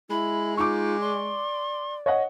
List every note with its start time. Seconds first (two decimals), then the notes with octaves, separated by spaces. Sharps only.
0.10 G#3 E4 B5
0.57 D#4 F4 C#6 D6
1.01 D5 C6
2.06 C#5 D#5 F#5